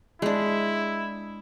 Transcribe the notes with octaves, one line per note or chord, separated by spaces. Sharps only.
G#3 D4 E4